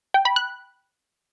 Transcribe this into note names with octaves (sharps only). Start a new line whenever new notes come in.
G5
B5
F#6